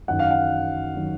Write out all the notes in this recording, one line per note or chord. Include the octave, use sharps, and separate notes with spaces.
F#2 D#3 F#3 F#5
F5
F#5
D#3 F#3